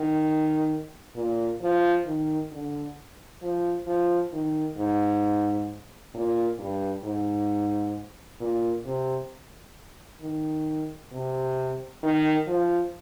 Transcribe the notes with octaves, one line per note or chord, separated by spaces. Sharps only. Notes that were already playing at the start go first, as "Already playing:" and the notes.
Already playing: D#3
A#2
F3
D#3
D3
F3
F3
D#3
G#2
A#2
G2
G#2
A#2
C3
D#3
C3
D#3
F3